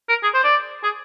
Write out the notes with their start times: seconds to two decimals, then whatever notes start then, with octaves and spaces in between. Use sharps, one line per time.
0.09 A#4
0.23 G#4
0.34 C5
0.44 D5
0.84 G#4